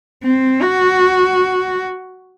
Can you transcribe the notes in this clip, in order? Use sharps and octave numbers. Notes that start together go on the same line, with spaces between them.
C4
F#4